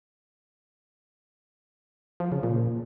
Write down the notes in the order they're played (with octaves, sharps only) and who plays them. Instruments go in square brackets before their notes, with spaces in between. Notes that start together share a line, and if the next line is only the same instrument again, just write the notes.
[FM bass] F3
C#3
A#2